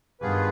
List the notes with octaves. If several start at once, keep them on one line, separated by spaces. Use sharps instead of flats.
G2 D#3 B3 F4 G#4 B4